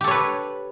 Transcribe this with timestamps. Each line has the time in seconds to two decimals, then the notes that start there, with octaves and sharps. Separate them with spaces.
0.01 G4
0.04 A4
0.08 C#5
0.11 B4